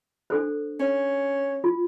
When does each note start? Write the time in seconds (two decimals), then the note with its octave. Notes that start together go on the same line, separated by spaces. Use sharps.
0.30 D4 A4 C5
0.80 C#4
1.64 F4